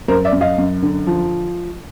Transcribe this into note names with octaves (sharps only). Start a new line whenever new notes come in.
F#2 A#4 C5
D5 E5
F#2
D#5 F5
F#2
D3
F3